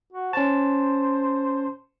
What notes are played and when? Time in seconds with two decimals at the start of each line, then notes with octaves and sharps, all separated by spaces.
0.13 F#4
0.33 C#4 C5 A5